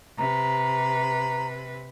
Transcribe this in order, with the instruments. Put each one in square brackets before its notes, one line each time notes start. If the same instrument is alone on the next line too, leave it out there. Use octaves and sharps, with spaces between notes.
[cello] C3 B4 [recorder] A#5